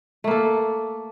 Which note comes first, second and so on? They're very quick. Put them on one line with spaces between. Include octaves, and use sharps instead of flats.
A3 A#3 A4